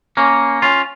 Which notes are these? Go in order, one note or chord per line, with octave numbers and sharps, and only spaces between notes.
A#3 C#4
C#4 F4